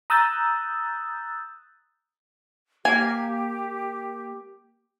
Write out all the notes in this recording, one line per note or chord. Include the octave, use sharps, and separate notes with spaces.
A#5 D#6 E6 F#6 G6 A6
A#3 G4 G#5